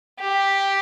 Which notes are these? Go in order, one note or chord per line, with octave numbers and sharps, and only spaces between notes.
G4